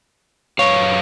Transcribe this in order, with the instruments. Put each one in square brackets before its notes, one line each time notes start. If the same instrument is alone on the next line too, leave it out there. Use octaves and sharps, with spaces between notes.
[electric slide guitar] F#2 B4 F5 [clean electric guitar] C#5